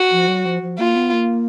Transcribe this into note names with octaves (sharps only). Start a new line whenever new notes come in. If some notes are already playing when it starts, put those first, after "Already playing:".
Already playing: F#4
F3
F#3
F3
F3
A#3 F4
B3
A#3